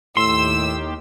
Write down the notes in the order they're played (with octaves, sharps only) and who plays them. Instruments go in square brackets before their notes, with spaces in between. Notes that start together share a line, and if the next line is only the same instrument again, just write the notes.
[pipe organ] D#2 D#3 G4 [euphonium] A2 [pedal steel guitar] C6 [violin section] E6